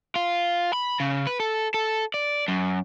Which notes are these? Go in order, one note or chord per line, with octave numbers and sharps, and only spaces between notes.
F4
B5
C#3
B4
A4
A4
D5
F#2